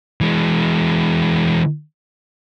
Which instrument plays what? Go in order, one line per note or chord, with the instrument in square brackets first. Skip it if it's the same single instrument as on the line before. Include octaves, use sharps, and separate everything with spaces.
[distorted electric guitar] E3 G#3